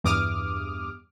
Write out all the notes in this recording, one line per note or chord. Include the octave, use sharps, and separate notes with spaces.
E2 G2 D6 D#6 F6